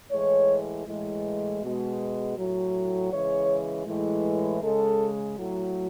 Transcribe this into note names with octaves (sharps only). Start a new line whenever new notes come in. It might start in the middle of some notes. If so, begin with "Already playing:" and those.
A2 E3 G#3 C#5
A2 E3 G#3
B2 G#3
A2 F#3
C#3 E3 G#3 C#5
A2 E3 G#3
C#3 G#3 A4
A2 F#3